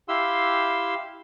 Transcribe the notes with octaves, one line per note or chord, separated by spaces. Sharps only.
E4 G4 F5 C6 E6